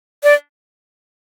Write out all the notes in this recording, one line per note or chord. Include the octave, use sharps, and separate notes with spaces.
D5